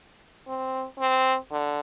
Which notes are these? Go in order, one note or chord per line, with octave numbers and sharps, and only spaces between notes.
C4
C4
D3